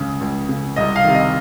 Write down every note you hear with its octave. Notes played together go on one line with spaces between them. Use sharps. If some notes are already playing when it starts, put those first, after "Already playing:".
Already playing: C#2 C#3
C#2
C#3
C2 D#5
F5
C3 D#3
D#5